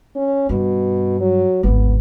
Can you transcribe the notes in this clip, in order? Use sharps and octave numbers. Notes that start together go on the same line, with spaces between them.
C#4
G2 B2
F#3
G#1 D2 B3